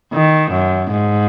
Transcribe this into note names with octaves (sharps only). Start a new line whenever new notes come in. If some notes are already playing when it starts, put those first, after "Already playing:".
D#3
F#2
G#2